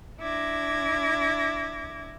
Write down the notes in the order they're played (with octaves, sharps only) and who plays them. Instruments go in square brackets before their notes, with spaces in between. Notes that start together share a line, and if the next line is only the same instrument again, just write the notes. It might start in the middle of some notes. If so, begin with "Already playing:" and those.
[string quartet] D4 E4 D6 G#6 A#6